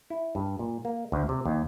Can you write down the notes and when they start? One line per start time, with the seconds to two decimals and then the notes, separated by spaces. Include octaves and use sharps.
0.10 E4
0.35 G2
0.59 A#2
0.85 A#3
1.12 D2
1.29 C3
1.46 D#2